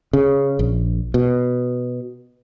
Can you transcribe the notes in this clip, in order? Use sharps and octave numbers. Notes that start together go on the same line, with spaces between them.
C#3
A#1
B2